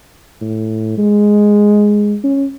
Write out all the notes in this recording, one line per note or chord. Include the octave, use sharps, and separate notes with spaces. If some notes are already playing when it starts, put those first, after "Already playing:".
A2
G#3
C#4